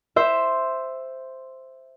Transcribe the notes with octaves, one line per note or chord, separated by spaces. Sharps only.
C5 E5